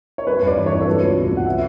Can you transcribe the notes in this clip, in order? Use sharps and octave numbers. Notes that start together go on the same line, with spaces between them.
C#5
G3 B4
G2
D5
E3
C#5
G2
A4
F#3 B4
C#2
B2
C#2
F#5
G3 E5